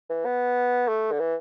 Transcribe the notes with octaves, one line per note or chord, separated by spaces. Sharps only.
E3
B3
A3
D3
E3